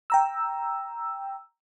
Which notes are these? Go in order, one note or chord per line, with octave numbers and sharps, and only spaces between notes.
G5 A#5 E6